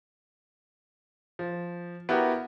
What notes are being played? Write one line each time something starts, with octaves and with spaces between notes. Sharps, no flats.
F3
B3 E4 F#4 G4 A#4